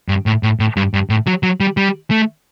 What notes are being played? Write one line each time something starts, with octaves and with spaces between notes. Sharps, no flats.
G2
A2
A2
A2
G2
G2
A2
F#3
F#3
G3
G3
A3